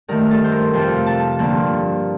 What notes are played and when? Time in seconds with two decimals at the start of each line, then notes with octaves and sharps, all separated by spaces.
0.08 G2 D#3 A3 A#4
0.31 A4
0.44 C5
0.52 A#4
0.73 F2 C3 F3 C5
1.06 A5
1.39 G2 D3 F3 A#3